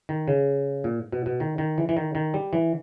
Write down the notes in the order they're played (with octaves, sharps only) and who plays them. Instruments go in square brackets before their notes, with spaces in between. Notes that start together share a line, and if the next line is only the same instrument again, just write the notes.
[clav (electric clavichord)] D#3
C#3
A#2
B2
B2
D#3
D#3
E3
E3
D#3
D#3
G3
E3